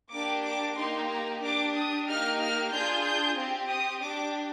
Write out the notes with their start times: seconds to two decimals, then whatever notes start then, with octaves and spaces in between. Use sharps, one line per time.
0.11 A#3 D4 G4 D6
0.44 D6
0.77 A#3 D#4 G4 C6
1.09 A#5
1.42 D4 G4 D6
1.74 D#6
2.07 A#3 D#4 G4 F6
2.40 F6
2.72 D4 F4 G#4 G6
3.04 G6
3.37 C4 G4
3.70 D#6
4.02 D4 G4 D6